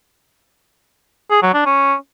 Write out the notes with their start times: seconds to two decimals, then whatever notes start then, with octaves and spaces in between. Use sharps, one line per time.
1.31 G#4
1.42 F#3
1.54 D4
1.66 C#4